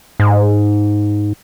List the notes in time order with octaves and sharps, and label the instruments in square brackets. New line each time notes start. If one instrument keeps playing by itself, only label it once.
[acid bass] G#2